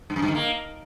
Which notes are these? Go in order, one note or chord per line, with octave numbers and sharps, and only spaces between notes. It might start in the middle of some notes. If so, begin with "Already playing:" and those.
G2
F#2
G2
D#3
A#3